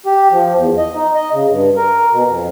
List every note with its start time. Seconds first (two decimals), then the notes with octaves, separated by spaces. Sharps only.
0.06 G4
0.31 F3
0.56 E2
0.78 D#5
0.95 D#4
1.15 D#5
1.33 C#3
1.49 G2
1.77 A#4
2.12 B2
2.28 F2